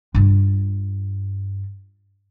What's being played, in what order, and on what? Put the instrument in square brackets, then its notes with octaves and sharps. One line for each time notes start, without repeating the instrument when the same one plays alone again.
[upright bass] G2 F4